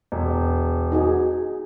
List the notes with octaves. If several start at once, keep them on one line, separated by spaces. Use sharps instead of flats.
E1
D#4 F#4 G#4